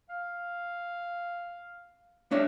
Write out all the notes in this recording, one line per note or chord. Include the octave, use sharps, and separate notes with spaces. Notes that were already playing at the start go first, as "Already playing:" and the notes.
F5
D4 C#5 E5